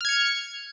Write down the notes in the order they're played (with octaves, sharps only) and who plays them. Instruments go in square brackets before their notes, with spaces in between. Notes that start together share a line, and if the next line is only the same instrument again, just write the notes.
[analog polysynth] F6
G#6
C#7